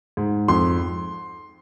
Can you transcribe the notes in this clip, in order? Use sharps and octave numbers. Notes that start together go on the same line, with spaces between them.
G#2
F2 C6